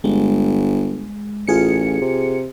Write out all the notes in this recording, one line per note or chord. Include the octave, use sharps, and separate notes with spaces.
G1 G#3
A1 F4 G#4 C#7
C3